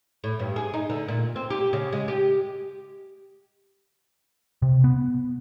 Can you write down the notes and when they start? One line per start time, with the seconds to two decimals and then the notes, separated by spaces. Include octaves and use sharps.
0.24 A2
0.39 G2
0.56 G#4
0.74 D#4
0.90 D3
1.08 A#2
1.36 C4
1.50 G4
1.73 C#3
1.93 G#3
2.08 G4
4.62 C3
4.84 B3